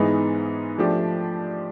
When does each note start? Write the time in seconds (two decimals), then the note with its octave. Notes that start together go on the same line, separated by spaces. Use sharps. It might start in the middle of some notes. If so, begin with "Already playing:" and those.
Already playing: G#2 E3 G#3 B3 D#4
0.78 F3 A3 D4 G4